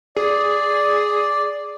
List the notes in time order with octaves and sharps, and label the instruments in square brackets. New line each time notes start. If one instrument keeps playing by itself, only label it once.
[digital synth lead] G#4 [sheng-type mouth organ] D5